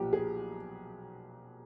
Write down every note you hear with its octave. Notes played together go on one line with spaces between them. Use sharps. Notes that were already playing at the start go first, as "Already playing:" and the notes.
Already playing: B1 A#2 F3 G4
G#4